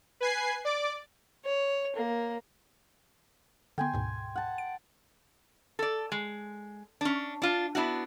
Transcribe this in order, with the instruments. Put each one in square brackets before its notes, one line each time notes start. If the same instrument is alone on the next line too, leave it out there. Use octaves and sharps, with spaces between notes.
[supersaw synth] B4 G#5 C7
D5 D6
[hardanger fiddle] C#5
A#3
[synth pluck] D3 B3 [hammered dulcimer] G5 G#5 C6
[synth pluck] D2 G#2 B2
[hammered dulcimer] F#5 A5
[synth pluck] D7
[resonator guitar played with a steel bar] A4 D5
G#3
C#4 D4
D4 F4
B3 D4 E4 F#4